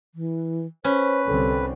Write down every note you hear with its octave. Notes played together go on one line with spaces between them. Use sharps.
E3
C#4 B4 C5
C2 D3 C4 A4